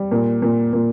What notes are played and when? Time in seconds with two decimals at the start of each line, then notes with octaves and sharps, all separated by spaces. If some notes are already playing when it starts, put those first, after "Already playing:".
Already playing: G3
0.12 A#2
0.42 A#2
0.73 A#2